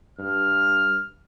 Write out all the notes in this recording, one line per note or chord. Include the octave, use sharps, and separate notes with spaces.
G2 F6